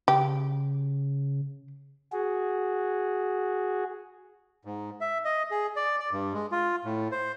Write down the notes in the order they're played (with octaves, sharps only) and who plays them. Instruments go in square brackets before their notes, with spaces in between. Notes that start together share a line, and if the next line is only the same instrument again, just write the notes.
[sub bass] C#3 [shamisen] G4
[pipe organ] F#4 G#4
[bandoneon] G#2
E5
D#5
G#4
D5
D5
G2
G#3
F4
A2
C5